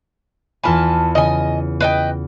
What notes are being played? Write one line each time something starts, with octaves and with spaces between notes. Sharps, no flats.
E2 F4 G#5 A5 B5
C#3 D#5 G#5
B4 D#5 G5